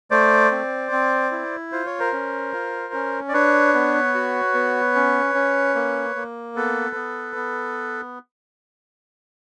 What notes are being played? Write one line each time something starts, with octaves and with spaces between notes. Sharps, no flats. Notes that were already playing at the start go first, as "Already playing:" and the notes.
A3 C5 D5
C4
C4
E4
F4 C5
C#5
A#4 C5
C#4
F4
C#4
D5
D4 B4 C#5
B3
F#4
B3
C#4
C#4
A#3
A#3
B3 A4 B4
B3
B3